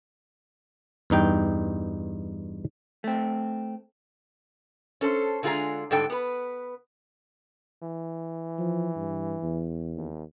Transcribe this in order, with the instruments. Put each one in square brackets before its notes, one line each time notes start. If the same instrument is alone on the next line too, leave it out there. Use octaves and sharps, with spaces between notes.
[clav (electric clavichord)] E2 G2 D#4 G5
[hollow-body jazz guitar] A3 C4
[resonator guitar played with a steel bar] C#4 A4 C5
D3 G#3 F4 G#4 G#5 A#5
G#2 D3 G3 A4 G5
B3 B4
[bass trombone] E3
[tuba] F3
G2
E2
[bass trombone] D#2